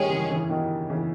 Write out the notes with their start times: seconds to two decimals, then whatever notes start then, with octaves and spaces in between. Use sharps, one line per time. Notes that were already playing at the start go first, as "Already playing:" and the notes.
Already playing: D#3 G3 G#3 C#4 G#4
0.09 C#3 E3
0.30 C#3 E3
0.49 B2 D#3
0.90 C#3 E3